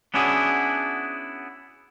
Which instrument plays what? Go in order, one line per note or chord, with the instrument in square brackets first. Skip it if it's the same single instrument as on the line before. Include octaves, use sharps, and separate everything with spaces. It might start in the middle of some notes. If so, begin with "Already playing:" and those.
[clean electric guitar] B3 C#4 D4 E4 F#4 G#4